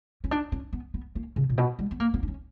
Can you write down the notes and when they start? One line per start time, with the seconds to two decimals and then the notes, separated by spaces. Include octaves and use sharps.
0.24 C#4
0.31 D4
0.52 C#4
0.73 B3
0.94 B3
1.15 A#3
1.36 C#3
1.49 A#2
1.58 B2
1.79 G3
1.91 B3
2.00 A#3
2.14 B3
2.23 D4
2.28 C#4